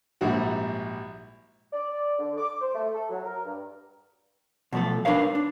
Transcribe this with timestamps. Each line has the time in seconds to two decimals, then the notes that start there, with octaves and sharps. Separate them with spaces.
0.21 A#1 G#2 G3 E4 F#4 F#5
1.72 D5
2.19 D3
2.37 D6
2.61 C5
2.75 A3
2.95 A4
3.10 F#3
3.25 A#4
3.45 G2
4.73 B2 F3 F#3 A3 A4
5.05 D4 D#4 A#4 B4 C#5 F5
5.35 D4